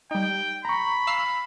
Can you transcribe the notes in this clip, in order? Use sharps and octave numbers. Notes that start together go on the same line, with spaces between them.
G3 D#4 G5
A#5 B5 C#6
F5 E6 C7